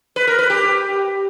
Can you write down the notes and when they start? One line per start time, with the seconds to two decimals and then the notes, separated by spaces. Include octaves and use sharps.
0.16 B4
0.27 A#4
0.39 B4
0.50 G4